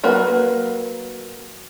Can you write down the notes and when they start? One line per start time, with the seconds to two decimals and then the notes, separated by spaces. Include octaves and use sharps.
0.04 F#3 A#3 B4